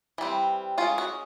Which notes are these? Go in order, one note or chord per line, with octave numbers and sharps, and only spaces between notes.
E3 G3 C4
G#3 C#4 F4
F#4